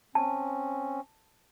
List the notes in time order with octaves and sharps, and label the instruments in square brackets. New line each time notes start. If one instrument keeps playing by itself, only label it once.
[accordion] C4 C#4 [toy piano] A5